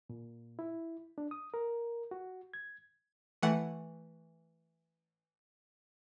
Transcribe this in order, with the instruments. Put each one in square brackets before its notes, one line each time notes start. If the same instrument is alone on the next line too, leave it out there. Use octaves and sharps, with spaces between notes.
[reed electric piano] A#2
E4
D4
D#6
A#4
F#4
G#6
[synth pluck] E3 A3 F#5